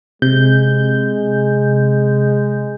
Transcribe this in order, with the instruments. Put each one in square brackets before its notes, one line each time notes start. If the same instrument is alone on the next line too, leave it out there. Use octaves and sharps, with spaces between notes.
[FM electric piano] C3 G6 [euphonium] G#3